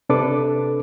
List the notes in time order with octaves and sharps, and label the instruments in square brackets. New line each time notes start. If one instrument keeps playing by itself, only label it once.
[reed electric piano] C3 D4 A4 B4 D6